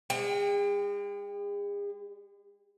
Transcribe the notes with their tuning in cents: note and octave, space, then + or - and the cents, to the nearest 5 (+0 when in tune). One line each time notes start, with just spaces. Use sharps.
G#3 -40 G5 +25